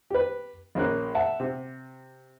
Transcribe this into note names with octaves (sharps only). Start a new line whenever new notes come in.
G4 B4
A#1 A#3 C#4 F#6
E5 F#5 A5
C3